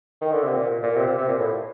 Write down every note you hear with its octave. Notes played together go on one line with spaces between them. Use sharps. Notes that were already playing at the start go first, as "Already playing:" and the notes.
D#3
D3
C3
A#2
A#2
C3
C3
C3
A#2
A2